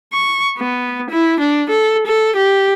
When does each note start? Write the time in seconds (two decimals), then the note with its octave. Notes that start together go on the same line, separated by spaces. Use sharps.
0.13 C#6
0.58 B3
1.10 E4
1.40 D4
1.70 A4
2.07 A4
2.36 G4